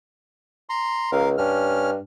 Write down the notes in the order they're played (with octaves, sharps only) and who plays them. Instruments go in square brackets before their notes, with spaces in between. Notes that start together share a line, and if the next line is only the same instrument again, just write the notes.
[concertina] A#5 C6
[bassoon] C#2 [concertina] A#4 F5
[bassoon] G2 [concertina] C#4 F6